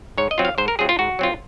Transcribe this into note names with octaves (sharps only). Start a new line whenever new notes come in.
G#2 C#5
D#5
F#3 C4 F4
F5
G#2 C5
A#4
F#3 C4 F4 G#4
F4
G#2 F#4
F#3 C4 F4